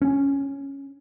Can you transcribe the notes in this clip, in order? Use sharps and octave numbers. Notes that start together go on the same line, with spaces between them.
C#4